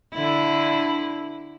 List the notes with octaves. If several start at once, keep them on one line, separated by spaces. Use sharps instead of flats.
D3 E4